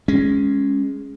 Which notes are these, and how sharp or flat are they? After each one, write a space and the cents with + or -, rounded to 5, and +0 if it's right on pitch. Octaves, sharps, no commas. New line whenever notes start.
G#3 +0 C#4 +0